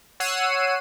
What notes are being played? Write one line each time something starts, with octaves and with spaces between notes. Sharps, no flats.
C#5 F#5 E6 C7 D#7